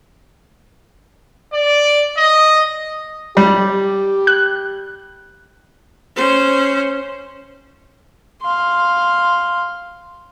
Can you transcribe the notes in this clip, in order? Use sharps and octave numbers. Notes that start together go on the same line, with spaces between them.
D5
D#5
G3 G4
F#6
C#4 C5
F5 C6